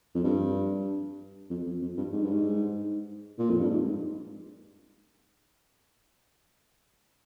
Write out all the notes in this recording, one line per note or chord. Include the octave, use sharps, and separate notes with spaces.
F2
G2
F2
F2
F2
G2
G#2
G2
G#2
A#2
F2
G2
G#2